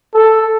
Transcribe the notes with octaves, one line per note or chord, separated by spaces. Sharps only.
A4